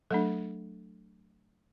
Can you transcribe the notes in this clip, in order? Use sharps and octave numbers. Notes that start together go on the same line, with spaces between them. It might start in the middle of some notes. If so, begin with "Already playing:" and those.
F#3 A3 D4 A4